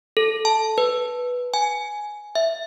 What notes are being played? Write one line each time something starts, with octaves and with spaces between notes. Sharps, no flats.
A4
A5
B4
G#5
E5